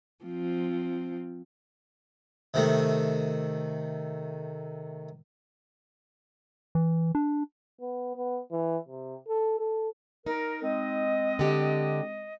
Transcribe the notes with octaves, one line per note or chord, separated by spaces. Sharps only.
F3 C4
C3 D#3 A3
E3
D4
B3
B3
E3
C3
A4
A4
D#4 A#4
G#3 C4 D#5
D3 G4